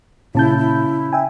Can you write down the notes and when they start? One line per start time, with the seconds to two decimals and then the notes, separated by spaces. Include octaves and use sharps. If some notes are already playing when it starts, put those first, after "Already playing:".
0.35 A#2 C#3 E4 A5 G6
0.58 E4
1.13 E5 G5 G#5